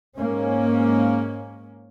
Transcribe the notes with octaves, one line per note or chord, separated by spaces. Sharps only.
G#2 A#3 C#4